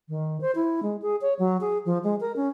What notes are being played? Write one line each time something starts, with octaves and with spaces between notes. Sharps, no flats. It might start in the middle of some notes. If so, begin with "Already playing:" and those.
D#3
C5
E4
G#3
G#4
C#5
F#3
G#4
F3
G#3
A#4
C#4